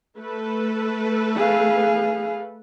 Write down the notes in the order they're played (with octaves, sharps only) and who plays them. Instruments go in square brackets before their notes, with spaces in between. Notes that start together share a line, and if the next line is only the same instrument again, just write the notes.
[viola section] A3 A4 B4
[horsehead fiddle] G#4 F5